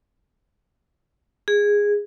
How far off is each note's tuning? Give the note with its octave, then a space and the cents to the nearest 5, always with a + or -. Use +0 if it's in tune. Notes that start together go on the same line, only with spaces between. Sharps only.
G#4 -10